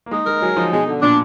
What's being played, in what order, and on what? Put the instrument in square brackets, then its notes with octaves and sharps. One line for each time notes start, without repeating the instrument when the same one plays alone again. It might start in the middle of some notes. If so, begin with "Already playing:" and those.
[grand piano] A#3
[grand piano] G#3 [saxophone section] D#4
[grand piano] G#3 [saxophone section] A#4
[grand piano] F#3 [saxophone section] G#3
[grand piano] F3 [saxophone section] D#4
[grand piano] B2 [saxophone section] G#3
[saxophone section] D3
[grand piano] A#2 [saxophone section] D4